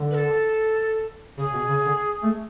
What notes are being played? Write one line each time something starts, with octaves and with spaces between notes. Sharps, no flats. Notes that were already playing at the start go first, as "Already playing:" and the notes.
Already playing: D3
B4
A4
C#3 G#4
B2
C#3
D3
A3